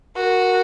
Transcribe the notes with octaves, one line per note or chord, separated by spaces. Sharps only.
F#4 A#4